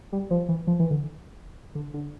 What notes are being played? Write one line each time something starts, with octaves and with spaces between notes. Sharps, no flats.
G3
F3
E3
F3
E3
D3
D3
D3